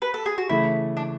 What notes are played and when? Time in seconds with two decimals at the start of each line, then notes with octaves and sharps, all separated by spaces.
0.02 B4
0.14 A4
0.26 G#4
0.38 F#4
0.49 C#3 E3 A3 E4
0.97 D4